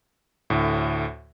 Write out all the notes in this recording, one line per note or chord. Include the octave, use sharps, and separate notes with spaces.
D2 A2